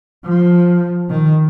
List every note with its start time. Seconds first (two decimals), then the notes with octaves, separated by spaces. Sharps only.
0.25 F3
1.10 D#3